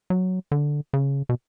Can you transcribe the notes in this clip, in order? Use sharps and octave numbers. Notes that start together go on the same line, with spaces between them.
F#3
D3
C#3
B2